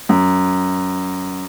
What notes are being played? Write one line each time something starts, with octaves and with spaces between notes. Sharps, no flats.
F#2